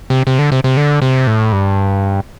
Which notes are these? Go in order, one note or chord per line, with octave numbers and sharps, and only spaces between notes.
C3
C3
D3
C3
C3
D3
C3
A2
G2